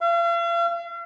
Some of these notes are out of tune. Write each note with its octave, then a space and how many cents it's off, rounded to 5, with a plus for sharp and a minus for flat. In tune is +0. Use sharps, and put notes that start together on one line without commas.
F5 -45